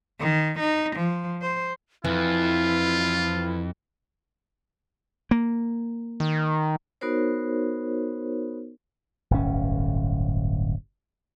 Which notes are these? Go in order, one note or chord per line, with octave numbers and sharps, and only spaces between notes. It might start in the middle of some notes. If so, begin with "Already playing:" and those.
D#3
D#4
F3
C5
F2 E3 E4 F4
A#3
D#3
B3 D#4 F#4 A#4 C5 C#5
D1 G1 C#4